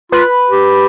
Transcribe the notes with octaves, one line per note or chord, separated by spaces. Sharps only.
F4 B4
G4